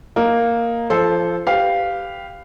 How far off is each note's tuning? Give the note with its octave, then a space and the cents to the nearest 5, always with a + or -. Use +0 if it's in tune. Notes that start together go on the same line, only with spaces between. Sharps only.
A#3 +0 D#4 +0
F3 -25 A4 -10 C5 +0
G4 +0 B4 +25 F5 +0